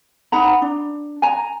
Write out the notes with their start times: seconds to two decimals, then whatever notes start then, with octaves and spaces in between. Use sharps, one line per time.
0.32 D#4 F#5 A#5 B5
0.62 D4
1.22 G#5 A#5